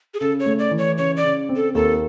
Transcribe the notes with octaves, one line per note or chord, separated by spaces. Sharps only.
G#4
C#3 A4
C#5
A3
D5
E3
C#5
C#3 C#5
D5
C#3
C4
A4
D#2 A4